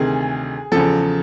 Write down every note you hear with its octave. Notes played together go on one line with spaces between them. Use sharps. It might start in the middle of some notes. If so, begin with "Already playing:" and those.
Already playing: D2 C3 D#3 G#4
E2 C#3 F3 A4